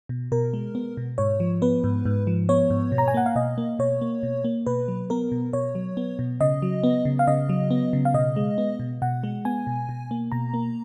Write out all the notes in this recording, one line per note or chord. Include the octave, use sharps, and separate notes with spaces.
B2
B2 A#4
G#3
B3
B2
G#2 C#5
F3
B3 B4
G#2
G#2
F3
B3 C#5
G#2
B2
A#5
G#5
A#3 F#5
F5
B2 D#5
A#3
B2 C#5
A#3
B2
A#3
B2 B4
F#3
B3 A#4
B2
B2 C#5
F#3
B3
B2
C#3 D#5
F#3
B3
C#3
F5
C#3 D#5
F#3
B3
C#3
F5
B2 D#5
G#3
B3
B2
B2 F#5
G#3
B3 G#5
B2
B2
A#3
B2 A#5
A#3